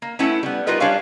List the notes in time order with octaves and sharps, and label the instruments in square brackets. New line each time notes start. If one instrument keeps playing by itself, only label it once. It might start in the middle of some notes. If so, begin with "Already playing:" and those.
[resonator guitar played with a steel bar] A#3
A3 B3 C#4 E4
G3 B3
G3 D#4 F4 A#4 B4 D#5
G3 D4 C#5 D5 F5 G#5